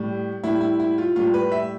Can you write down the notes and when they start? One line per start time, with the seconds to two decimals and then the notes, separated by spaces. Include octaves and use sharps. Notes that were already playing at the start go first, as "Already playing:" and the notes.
Already playing: A2 G3
0.43 A2 G3 E4
0.61 E4
0.80 E4
0.98 F4
1.16 A2 G3 F4
1.34 B4
1.52 E5